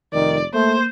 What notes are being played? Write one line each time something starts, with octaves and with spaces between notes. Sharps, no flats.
F1 D#3 D5
A3 A#3 C5